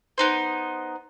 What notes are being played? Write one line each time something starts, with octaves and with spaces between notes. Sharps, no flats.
B3 D#4 C5